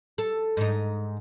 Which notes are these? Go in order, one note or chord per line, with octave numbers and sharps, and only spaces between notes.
A4
G#2 D#4